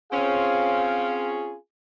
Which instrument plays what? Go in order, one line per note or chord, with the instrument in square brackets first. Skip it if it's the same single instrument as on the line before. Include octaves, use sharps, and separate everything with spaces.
[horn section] C4 C#4 [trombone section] F4 G#4 [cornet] F5